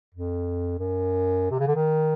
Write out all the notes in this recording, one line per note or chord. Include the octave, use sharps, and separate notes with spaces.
F2
F#2
C3
C#3
D3
D#3